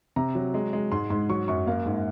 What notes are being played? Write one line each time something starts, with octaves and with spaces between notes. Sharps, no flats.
C3 A#5
F#3
G#3
G#3
G#2 C6
G#2 C6
F#3 C#6
F#2 C#6
A#3 F5
G#2